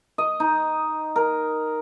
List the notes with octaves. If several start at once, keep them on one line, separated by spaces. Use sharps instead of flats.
D#5
D#4
A#4